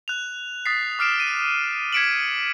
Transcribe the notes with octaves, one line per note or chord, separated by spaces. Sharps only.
F#6 F7
D#6 A6 B6 C7
D6 F6 C7 D7 E7
D#7
G#6 B6 C#7 D7 E7 F#7